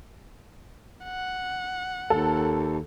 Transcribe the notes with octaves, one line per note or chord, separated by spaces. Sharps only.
F#5
D#2 A4